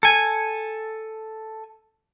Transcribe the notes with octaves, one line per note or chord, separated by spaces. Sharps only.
A4 G#5